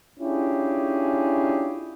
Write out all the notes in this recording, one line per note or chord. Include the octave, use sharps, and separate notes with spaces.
C#4 D4 E4 F4 G4 G#4